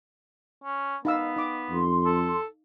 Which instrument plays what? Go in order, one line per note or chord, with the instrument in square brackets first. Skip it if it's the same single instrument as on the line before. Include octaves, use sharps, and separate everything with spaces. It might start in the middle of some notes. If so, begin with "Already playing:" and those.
[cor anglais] C#4
[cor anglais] B3 [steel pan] D#4 F5 E6
[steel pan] D#4 D6
[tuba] F2 [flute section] C6
[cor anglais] A4